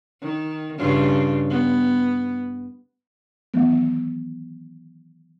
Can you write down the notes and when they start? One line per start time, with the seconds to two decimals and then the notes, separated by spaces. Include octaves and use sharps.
0.21 D#3
0.78 G2 C#3 F4
1.49 B3
3.54 D#3 E3 F#3 A3 B3